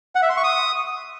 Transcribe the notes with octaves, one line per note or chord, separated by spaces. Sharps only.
F#5
E5
C6
C#6
D#6